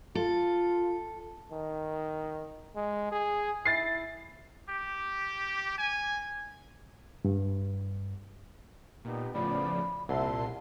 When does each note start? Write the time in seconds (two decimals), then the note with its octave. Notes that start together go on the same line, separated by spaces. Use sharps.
0.15 F4 A4
1.52 D#3
2.76 G#3
3.12 G#4
3.65 E4 A6 C7
4.69 G4
5.78 G#5
7.25 G2
9.05 A#2 B3 D#4 G4
9.34 A2 C#3 F3 B3 D5 B5
10.09 C2 A#2 E5 A5 C6